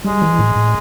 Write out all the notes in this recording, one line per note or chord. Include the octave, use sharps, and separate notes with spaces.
G3 G#3
E3
A2
A2